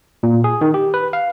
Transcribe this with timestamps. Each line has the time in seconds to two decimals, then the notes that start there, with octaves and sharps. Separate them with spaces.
0.23 A#2
0.44 G#4
0.61 D#3
0.74 G4
0.94 B4
1.13 F5